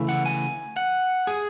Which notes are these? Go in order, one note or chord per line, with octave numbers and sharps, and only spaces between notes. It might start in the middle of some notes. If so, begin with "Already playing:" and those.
Already playing: C#3 E3 A3
F#5
G#5
F#5
G#4